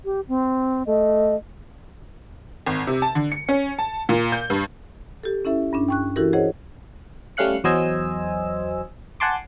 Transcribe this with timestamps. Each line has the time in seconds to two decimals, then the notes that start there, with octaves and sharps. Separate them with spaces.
0.05 G4
0.28 C4
0.87 A3 D#5
2.66 G#1
2.87 C3
3.02 A5
3.15 D3
3.32 C#7
3.49 C#4
3.79 A5
4.09 A#2
4.32 G6
4.50 G2
5.23 G4 A4
5.45 C#4 E4 A4 E5
5.73 G2 C#4 D4
5.88 G5 C#6 F#6
6.16 E3 E4 F#4 G4 A4 A#4
6.33 G#4 C5 C#5 D#5 F#5
7.37 G3 A3 C#4 F5 F#6 C#7
7.64 E2 F#3 C5 D#5 G#5 E6
9.20 F#5 G#5 A5 C6 D6